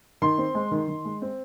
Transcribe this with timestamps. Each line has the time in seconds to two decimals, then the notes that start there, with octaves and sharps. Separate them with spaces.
0.22 D#3 C6
0.38 C4
0.55 G#3
0.71 D#3
0.88 D#3
1.05 G#3
1.22 C4